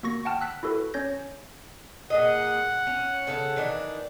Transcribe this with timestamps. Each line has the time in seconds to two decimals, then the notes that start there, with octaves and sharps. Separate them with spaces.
0.03 A#3 F#4 C#6 A#6
0.25 F#5 G5 A5 F6
0.41 E6 F#6 B6
0.63 E4 F#4 A4 B4
0.94 C#4 C#5 G6 A#6
2.10 A#2 G#4 D#5 F#5
2.87 C#4
3.27 C#3 A4 F5
3.56 D#3 E3 D4